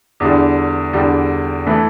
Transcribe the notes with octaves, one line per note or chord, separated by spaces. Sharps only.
E2 D3 G3
E2 D3 G3
E3 A3 E4